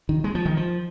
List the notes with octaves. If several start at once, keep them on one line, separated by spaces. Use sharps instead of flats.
D#3
G#3
F3
D#3
F3